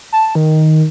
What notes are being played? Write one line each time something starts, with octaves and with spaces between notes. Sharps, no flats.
A5
D#3